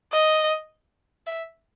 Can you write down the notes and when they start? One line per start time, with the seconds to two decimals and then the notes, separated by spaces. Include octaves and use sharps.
0.13 D#5
1.27 E5